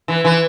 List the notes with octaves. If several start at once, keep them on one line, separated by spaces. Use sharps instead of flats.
E3
E3